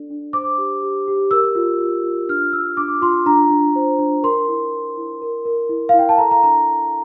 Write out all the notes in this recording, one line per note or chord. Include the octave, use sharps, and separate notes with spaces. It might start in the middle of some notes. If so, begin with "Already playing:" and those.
Already playing: D4 A4 D5
D4
C5 D6
G4
G4
G4
A#4 E6
F4
F4
F4
D4 F6
D4 E6
D4 D6
F4 C6
D4 A#5
D4
C5
D4
A#4 C6
E4
A#4
E4
A#4
A#4
E4
E4 F5
G5
A5
A4 A#5
A#5
D4 A#5